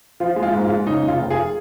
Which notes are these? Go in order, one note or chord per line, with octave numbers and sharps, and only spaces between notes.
F3 F4
G#3
F4
G#2
F4
G#3
C#3 D#4
F1
F4
F1
F4 G#4